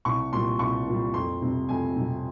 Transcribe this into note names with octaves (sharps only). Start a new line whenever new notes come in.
C2 C#6
A#2 G3 C6
C2 C#6
A#2
G3
F2 C6
C3 G3
F2 G#5
C3 G3